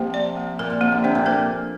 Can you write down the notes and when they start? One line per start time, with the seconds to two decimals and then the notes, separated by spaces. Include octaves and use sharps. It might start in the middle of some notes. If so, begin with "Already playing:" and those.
Already playing: C3 F3 A#3
0.14 D5
0.36 A#3
0.59 A#2 A#4
0.70 A#2
0.81 C3 A#3
0.92 D3
1.04 C3 D4
1.15 A#2
1.26 A#2 C5